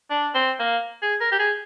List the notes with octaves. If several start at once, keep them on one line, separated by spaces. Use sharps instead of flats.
D4
C4
A#3
G#4
A#4
G4
G#4